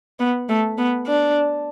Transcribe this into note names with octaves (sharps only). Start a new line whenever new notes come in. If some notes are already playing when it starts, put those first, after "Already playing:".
B3
A3
B3
D4